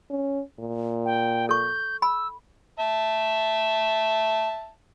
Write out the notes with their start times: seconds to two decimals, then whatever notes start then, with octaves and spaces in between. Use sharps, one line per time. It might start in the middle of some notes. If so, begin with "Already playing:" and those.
0.10 C#4
0.59 A#2
1.05 G5
1.49 A4 C#6 G6
2.02 B5 E6
2.79 E5 A5